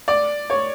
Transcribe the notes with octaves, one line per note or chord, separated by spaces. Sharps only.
D5
C#5